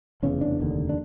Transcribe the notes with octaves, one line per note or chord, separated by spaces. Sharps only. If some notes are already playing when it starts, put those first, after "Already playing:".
F1 E2 C#3 C#4
D4
F1 D#2 D3
D4